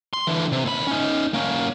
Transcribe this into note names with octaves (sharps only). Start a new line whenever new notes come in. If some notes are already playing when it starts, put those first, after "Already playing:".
C6
D3 E3
C3
D#2 B5
C#4 D#4
A#3 C#4